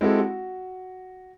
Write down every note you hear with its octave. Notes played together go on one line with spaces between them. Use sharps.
G#3 C4 E4 F#4 G4 A4
F#4